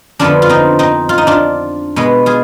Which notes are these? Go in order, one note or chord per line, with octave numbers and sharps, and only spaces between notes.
F2 D3 F3 B3 D4 F4
F4
C4 D#4
C4 D#4
F4
D#4
D4 F4
B2 G#3 B3
F4 G#4